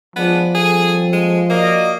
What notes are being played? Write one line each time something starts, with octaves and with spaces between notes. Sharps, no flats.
F3 G#3 B3 D4
G3 C4 G#4 A4
G#3
A#3 F#4 D5 D#5